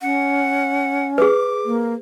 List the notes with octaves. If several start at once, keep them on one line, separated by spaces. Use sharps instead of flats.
C#4 F#5
G#4 B4 D6
A#3